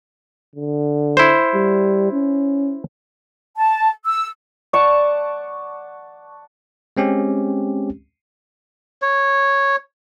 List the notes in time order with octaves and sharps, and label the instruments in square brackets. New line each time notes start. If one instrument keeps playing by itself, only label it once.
[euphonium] D3
[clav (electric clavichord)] E4 C5
[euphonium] G3
C#4
[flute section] A5
E6
[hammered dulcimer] D5 F#5 A5 C#6
[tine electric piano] G#3 C4 C#4 G4
[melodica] C#5